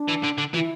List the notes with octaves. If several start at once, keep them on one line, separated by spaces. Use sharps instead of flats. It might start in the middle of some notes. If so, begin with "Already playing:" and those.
Already playing: D4
E3
D3
D3
E3 F4
E4